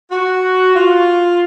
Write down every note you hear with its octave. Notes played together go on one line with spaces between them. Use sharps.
F#4
F4